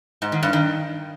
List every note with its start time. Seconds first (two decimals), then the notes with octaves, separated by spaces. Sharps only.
0.22 G#2
0.32 D#3
0.43 G2
0.53 D#3